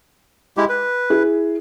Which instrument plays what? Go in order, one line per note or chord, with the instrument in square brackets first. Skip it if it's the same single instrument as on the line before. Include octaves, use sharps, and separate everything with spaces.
[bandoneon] G#3 E4 G4
B4
[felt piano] E4 G#4